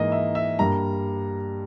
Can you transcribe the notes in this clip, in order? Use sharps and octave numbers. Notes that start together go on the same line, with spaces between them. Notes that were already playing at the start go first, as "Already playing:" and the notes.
Already playing: G#2 E3 A#3 D#5
E5
E5
G2 G3 A#3 A#5